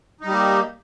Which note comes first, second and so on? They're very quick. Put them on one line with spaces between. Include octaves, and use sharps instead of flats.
D#4 G3 G4 A#3